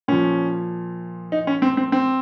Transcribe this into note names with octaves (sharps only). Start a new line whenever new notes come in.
A#2 F3 C#4
D#4
C#4
C4
C4
C4